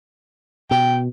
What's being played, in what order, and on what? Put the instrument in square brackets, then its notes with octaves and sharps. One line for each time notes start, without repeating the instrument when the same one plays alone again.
[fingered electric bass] B2 [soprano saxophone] G5